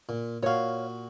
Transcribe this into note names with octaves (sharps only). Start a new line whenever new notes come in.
A#2
A#2 F#4 C#5 F5